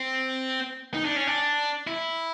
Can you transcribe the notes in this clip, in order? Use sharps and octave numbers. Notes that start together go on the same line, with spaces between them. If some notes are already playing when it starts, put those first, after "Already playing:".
Already playing: C4
D#4
D4
C#4
D4
E4